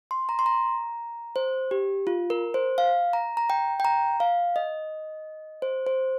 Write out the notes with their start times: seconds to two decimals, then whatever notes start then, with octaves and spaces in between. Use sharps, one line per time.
0.11 C6
0.29 A#5
0.39 C6
0.46 A#5
1.36 C5
1.71 G4
2.07 F4
2.30 A#4
2.54 C5
2.78 F5
3.13 A#5
3.37 A#5
3.50 G5
3.80 G5
3.85 A#5
4.20 F5
4.56 D#5
5.62 C5
5.87 C5